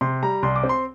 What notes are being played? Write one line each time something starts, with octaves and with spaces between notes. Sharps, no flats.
C3 C6
G3 A#5
C2 C6
D6
C4
C6